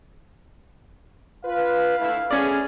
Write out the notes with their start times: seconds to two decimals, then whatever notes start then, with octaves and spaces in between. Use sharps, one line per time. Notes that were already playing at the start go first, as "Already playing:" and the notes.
1.45 F4 B4 F5
1.99 D2 A3 E4
2.31 A3 B3 C#4 G#4 D5